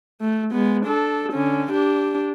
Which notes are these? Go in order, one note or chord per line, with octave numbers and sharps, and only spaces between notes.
A3
G#3 B3
D4 A4
D3 C#4
D4 G4